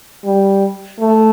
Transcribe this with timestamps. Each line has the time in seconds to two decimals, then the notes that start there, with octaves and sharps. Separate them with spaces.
0.25 G3
1.01 A3